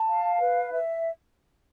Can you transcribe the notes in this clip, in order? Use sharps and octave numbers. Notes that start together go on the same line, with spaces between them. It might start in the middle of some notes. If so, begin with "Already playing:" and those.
Already playing: A5
F5
B4
E5